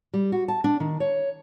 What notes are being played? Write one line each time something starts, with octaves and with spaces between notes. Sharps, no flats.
G3
F#4
A5
D4
D#3
C#5